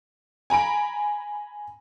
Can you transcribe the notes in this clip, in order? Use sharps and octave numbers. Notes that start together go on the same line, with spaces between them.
G#5 A#5 B5 D7